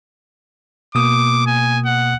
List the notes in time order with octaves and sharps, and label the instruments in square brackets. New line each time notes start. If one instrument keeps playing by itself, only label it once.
[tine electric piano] B2 A#3 D#6 [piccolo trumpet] D6
[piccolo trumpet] G#5
F#5